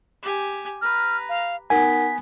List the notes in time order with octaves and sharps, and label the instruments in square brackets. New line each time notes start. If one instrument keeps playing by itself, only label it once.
[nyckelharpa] G4 G#5
[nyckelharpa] B4 A#5 [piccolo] F6
[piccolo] F5
[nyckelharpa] B3 [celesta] D#4 A#4 F#5 [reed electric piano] G#5 [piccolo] B6